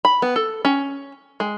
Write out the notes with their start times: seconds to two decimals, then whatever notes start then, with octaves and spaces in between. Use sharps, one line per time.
0.05 B5
0.22 B3
0.36 A4
0.65 C#4
1.40 G#3